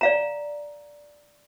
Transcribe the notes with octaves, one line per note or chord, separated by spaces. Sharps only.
D5 F5 A#5